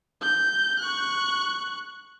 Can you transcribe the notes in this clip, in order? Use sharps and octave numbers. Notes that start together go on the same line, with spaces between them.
G6
C#6 F#6